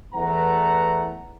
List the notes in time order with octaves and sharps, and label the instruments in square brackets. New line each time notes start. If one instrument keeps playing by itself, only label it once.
[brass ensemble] E2 E3 A3 B4 F#5 A#5